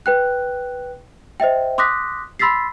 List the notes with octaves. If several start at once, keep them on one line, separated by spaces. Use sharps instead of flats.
B4 G5 F#6
C5 D#5 E5 G5
C6 D6 D#6 F#6 A#6 B6
B5 C6 E6 A6 B6 C7